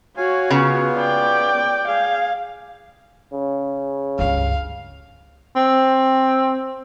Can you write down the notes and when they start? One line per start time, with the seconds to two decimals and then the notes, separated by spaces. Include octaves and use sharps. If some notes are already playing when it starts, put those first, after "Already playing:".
0.17 F#4 C#5 F5 G#5
0.50 C#3 B3 F4
0.98 D5 G5
1.88 G#4 F5
3.33 C#3
4.19 C#2 G2 F5
5.56 C4